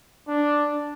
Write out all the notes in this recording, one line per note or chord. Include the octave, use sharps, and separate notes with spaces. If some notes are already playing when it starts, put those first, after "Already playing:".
D4